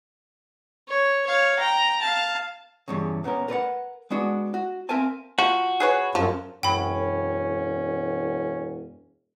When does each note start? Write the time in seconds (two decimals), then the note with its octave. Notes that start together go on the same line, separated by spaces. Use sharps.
0.89 C#5
1.27 C#5 F5
1.59 G5 A#5
2.02 F5 A5
2.88 E2 G2 C#3
3.24 A#2 B3 C#4 A#4
3.48 A#4 B4 D5 F#5
4.10 G#3 B3 D4 F#4
4.54 F#4
4.89 C4 A#4 E5 F5 G#5 A5
5.39 F3 F#4
5.80 G#4 B4 C#5
6.15 F#2 F3
6.63 E1 F#2 C#4 G5 B5